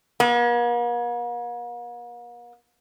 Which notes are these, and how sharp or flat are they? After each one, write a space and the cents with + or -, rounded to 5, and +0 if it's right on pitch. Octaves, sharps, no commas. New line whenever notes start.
A#3 +45